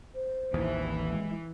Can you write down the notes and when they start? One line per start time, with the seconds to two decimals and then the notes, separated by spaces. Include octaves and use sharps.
0.15 C5
0.54 A1 D#2 E3
1.07 G#3